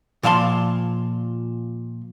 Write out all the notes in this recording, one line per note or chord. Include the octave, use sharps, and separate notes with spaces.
A#2 F3 F5 A5 C6